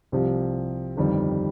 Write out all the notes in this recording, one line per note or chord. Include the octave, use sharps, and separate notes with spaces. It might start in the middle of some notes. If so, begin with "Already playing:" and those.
C2 C3 F3
G1 F2 D#3 G3